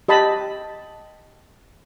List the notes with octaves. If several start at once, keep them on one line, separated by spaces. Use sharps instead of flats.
G4 D#5 A5 B5